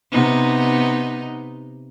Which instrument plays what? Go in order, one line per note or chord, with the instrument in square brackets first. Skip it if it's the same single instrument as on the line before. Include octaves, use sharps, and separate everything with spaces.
[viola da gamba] C3 B3 D#4